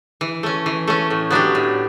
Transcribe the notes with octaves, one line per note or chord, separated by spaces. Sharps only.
E3
A3 C#4
E3
A3 C#4
A2
F#3 B3 D4 G4
A2